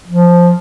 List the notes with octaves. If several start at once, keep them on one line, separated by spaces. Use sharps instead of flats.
F3